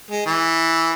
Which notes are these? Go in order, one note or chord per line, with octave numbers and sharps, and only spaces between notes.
G#3
E3